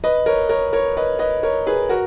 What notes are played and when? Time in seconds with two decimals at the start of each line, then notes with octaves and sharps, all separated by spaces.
0.04 B4 D#5
0.26 A#4 C#5
0.49 A#4 C#5
0.73 A#4 C#5
0.97 B4 D#5
1.19 B4 D#5
1.43 A#4 C#5
1.67 G#4 B4
1.89 F#4 A#4